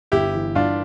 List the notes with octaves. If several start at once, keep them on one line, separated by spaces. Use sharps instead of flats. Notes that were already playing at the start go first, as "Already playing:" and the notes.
G1 E4 G4
E3
G2 D4 F4